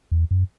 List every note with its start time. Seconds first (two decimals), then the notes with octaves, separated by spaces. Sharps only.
0.11 E2
0.31 F#2